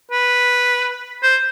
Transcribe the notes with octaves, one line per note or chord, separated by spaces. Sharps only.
B4
C5